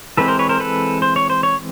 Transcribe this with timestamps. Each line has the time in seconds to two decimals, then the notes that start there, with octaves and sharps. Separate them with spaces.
0.17 E3 G#3 C4 A4 B4
0.28 A#4 C5
0.39 B4 C#5
0.49 A#4 C5
0.60 A4 B4
1.02 C5
1.16 C#5
1.30 C5
1.43 C#5